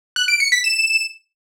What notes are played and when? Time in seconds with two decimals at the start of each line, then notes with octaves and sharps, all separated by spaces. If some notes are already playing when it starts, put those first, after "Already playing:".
0.16 F#6
0.28 D7
0.40 C#7
0.52 B6
0.64 E7